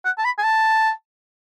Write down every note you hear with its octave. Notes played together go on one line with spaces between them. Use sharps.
F#5
A5
B5
G#5
A5